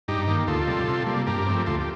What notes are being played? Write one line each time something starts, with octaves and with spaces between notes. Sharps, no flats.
G2 D#4 G4
D#3 A#3
D2 F4 A4
C3 G3
C3
G3 A#3
G2 G4 A#4
F3 A3 C4
D2 F4 A4
G4